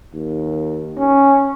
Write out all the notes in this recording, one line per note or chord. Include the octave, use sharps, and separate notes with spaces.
D#2
C#4